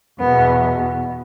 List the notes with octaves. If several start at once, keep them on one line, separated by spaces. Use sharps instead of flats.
E2 B2 B3